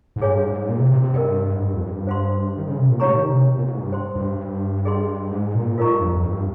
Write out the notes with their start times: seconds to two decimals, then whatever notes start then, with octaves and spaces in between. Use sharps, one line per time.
0.16 G#2
0.21 G2 G#4 C#5 F5 G#5
0.45 G#2
0.68 A#2
0.80 C3
0.91 C3
1.03 C3
1.14 G2 A#4 D#5 G5
1.56 G#2
1.61 G2
1.73 F2
1.83 G2
2.07 C5 F5 C6
2.57 D#3
2.67 C#3
2.78 C3
2.89 A#2
3.00 G#2 G4 C#5 F5 A#5 C#6
3.15 D#3
3.31 C3
3.58 A#2
3.69 G#2
3.80 G2
3.92 C5 G5 C6
4.16 G2
4.85 G#4 D#5 G5 C6
5.32 G#2
5.54 A#2
5.77 G#2 F4 A#4 D#5 A#5 C#6
5.90 G2
6.01 F2
6.13 F2
6.25 G2